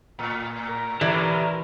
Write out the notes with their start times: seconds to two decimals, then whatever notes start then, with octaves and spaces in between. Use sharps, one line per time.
0.19 A2
0.66 A#4
1.01 A2 E3 G4 D5 E5